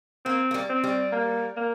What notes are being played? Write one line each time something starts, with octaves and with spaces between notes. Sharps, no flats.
A#3 C4
A#3
G3
C4
G3
A#3
A#3